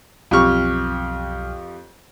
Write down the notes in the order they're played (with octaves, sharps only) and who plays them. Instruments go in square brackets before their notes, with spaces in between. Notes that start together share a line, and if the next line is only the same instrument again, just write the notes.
[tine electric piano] B1 F6 [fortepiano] F2 G4 C#6